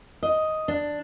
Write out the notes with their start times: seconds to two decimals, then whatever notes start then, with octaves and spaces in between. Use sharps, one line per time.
0.23 D#5
0.68 D4